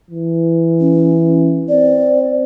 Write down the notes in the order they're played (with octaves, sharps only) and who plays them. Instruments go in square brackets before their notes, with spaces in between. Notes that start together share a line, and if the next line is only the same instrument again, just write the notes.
[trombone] E3
[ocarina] C#4
[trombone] C4 [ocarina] D5